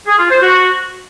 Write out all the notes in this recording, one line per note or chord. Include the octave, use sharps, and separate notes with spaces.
G#4
F4
C5
F#4